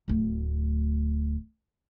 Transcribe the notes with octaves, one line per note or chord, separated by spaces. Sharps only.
D1 D2